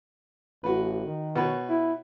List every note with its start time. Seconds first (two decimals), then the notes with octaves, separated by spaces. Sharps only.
0.64 A1 F#4 B4
1.06 D#3
1.36 B2 B4 C#5
1.69 E4